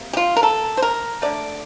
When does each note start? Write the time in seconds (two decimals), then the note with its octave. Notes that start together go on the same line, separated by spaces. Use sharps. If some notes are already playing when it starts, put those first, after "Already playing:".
Already playing: C3 A#3
0.13 G4
0.17 F4
0.36 A#4
0.43 A4
0.77 C5
0.82 A#4
1.22 D3 A3 D5